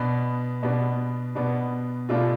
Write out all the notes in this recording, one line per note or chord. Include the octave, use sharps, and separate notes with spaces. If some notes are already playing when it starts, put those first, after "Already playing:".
Already playing: B2 B3 D4
B2 B3 D4
B2 B3 D4
B2 A3 D4 F4 A4